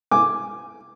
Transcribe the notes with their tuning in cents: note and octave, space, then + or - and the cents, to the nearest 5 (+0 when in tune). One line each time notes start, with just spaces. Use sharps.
G#5 +0 D6 +0